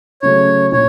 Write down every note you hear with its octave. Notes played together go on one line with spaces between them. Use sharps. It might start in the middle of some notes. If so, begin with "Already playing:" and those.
C#3 F#3 A3 C#5
A#2 C#5